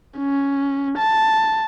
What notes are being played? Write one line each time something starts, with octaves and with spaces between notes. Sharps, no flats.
C#4
A5